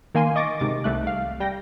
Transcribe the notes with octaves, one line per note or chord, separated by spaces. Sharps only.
D#3 A#3 G#5 C6 D#7
D#5 C#6 D6 A6 A#6 D7
G#2 C3 D6 A6
C2 A3 F#6
F5
G3 G5 A#6